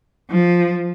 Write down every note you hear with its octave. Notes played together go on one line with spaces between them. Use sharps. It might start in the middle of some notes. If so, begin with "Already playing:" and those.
F3